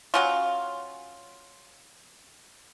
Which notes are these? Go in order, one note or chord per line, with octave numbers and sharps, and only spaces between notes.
F#3 C#4 F4